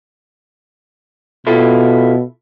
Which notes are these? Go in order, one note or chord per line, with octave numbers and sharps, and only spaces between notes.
B2 E4 F4 A4